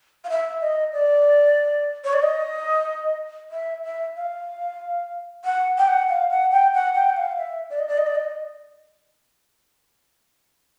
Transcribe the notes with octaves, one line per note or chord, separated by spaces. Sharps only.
F5
E5
D#5
D5
C#5
D5
D#5
E5
E5
F5
F#5
G5
F#5
F5
F#5
G5
F#5
G5
F#5
F5
E5
D5
D#5
D5
D#5
D5
D#5